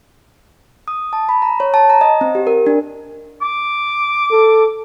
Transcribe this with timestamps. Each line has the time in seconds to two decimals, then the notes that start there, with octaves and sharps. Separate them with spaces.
0.88 D#6
1.13 A5
1.29 B5
1.42 A#5
1.60 C#5
1.74 A5
1.90 A#5
2.01 D#5
2.21 C4
2.35 G4
2.47 A#4
2.67 D4
3.42 D6
4.31 A4